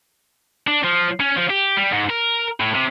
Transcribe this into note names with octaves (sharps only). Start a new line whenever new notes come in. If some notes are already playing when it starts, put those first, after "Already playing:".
D4
F3
C#4
F3
G4
G3
G#2
A#4
A2
C3